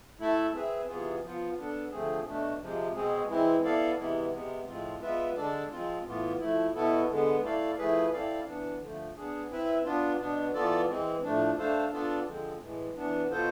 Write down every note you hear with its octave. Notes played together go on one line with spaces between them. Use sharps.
A3 E4 A4 E5
C4 G#4 B4 E5
C3 E3 B3 F4 G#4
F3 B3 F4
B3 D4 A4
D3 F3 A3 C4 G#4
B2 A3 D4
C3 F3 G#3
B2 G#3 C4 G#4
E3 G#3 C4 E4
B3 E4 A4 D5 F5
C3 E3 G#3 B3 E4
C3 G#3 B3
A2 F3 G#3 C4 F4
G#3 B3 F4 B4 E5
D3 G#3 D4 A4 D5
F3 G#3 C4 F4
A2 E3 B3 F4
F3 A3 E4
B2 B3 E4 A4
D3 G#3 B3
A3 E4 A4 D5 F5
F3 A3 E4 G#4 B4
C4 E4 A4 D5 F5
E3 B3 D4
D3 F3 A3
B3 D4 G#4
C4 E4 B4 E5
B3 D4 F4
B2 B3 D4
E3 B3 F4 A4 D5
E3 G#3 C4
A2 F3 A3 D4
A3 D4 A4 C5 F5
B3 D4 F4 A4 D5
D3 F3 G#3 C4
A2 E3 G#3
E3 B3 D4
B2 B3 F4 A4 C5